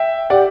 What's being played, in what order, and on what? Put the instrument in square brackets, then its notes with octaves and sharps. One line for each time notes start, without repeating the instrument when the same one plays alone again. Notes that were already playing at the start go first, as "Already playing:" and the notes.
Already playing: [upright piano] E5 G5
[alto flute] G4 [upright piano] D5 F#5